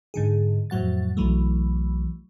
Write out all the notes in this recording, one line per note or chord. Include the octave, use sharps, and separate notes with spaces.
G#2 D3 G#4
F2 A2 F#3 F#5 A6
B1 E3 F#3 A3